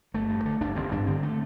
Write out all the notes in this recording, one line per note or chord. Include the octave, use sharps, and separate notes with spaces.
G1 A3
G2
D3
G1 D4
G1 C4
G2 D4
D3 C4
A3